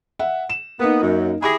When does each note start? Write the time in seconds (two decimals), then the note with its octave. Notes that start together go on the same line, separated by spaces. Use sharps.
0.19 E5 F#5
0.50 E7
0.80 A#3 B3 D#4
1.01 F#2
1.42 E4 G4 G#4 B5 D6 A#6